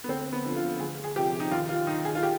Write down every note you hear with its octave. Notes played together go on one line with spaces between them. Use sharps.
B3
D2 C4
B3
D3 F3
F4
D2 G#4
G#4
C3 F3 G4
D#4
D#2 F4
F4
D#3 D#4
G#4
F4
G4